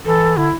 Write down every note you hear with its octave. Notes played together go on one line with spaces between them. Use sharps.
E3 A4
D3 E4